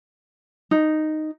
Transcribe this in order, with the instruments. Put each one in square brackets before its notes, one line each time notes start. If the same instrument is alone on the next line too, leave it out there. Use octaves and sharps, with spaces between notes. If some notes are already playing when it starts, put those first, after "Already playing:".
[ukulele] D#4